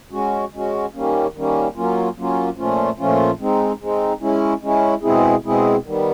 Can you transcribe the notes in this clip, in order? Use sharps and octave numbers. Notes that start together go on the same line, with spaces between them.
G#3 C#4 F#4
G#3 C#4 F#4
D#3 G3 A#3 C#4
D#3 G3 A#3 C#4
F#3 A#3 C#4 F4
F#3 A#3 C#4 F4
A#2 F3 A3 C#4 F4
A#2 F3 A3 C#4 F4
G#3 C4 D#4
G#3 C4 D#4
G#3 C#4 E4
G#3 C#4 E4
B2 G#3 C4 E4 G#4
B2 G#3 C4 E4 G#4
D#3 G3 B3